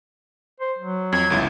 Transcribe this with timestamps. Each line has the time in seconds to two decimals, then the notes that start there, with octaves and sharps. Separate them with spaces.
0.61 C5
0.79 F#3
1.13 F2 G#6
1.30 G1 C#2 E4